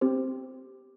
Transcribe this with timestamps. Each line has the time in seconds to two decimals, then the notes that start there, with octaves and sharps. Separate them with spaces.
0.01 C4 G4 C5